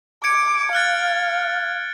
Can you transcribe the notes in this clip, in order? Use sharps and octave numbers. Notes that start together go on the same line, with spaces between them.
D6 G#6 C#7 D7
F5 F6 F#6 A6